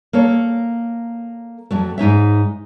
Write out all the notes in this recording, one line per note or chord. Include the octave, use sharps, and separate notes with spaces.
A#3 A4 C#5
F2 F#3 A3
G#2 D#4 C#5 E5